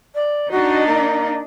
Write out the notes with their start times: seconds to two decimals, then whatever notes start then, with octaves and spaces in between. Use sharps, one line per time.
0.14 D5
0.51 D4 D#4 F#4
0.86 A#3